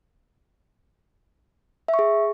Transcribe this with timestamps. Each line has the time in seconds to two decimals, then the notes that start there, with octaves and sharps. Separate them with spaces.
1.88 E5
1.94 C#6
1.99 G#4